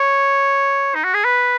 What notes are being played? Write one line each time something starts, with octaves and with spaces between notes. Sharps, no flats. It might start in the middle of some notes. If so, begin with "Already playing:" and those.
Already playing: C#5
D#4
F#4
G#4
B4